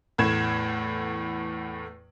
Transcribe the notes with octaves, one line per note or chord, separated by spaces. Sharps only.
E2 A2 A3 G#6 E7